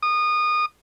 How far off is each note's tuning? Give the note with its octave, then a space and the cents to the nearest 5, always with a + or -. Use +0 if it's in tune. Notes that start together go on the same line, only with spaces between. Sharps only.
D#6 -25